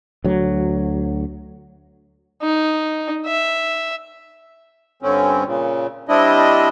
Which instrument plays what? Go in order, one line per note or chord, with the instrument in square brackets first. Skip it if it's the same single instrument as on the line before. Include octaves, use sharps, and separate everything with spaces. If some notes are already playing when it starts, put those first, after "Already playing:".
[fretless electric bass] D2 F#3
[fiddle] D#4
E5
[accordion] G2 D3 C4 C#4
A#2 C#3
G3 C4 D4 E4 D#5